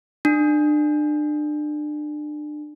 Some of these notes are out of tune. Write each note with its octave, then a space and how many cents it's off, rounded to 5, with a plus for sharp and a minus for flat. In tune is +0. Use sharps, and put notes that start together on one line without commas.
D4 +30